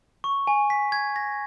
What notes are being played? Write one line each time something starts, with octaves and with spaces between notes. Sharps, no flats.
C#6
G#5
B6
G#6
A#6